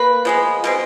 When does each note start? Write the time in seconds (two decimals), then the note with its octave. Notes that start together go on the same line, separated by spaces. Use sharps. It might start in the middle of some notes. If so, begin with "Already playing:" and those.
Already playing: A#3 B4
0.25 F3 G#3 B3
0.64 B2 G#3 C4